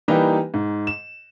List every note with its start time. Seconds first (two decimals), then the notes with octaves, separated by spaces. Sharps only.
0.08 E3 G3 A#3 D#4 G4 B4
0.54 G#2
0.87 E7